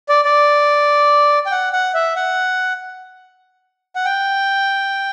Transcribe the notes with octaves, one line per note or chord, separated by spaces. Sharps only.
D5
D5
G5
F#5
F#5
E5
F#5
F#5
G5